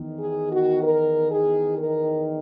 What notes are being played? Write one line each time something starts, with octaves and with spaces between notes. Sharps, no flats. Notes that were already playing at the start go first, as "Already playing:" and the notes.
Already playing: E2 D#3
G#4
F#4
A#4
G#4
A#4